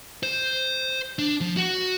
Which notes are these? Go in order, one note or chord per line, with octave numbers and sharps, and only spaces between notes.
C5
D4
F3
F#4 F#5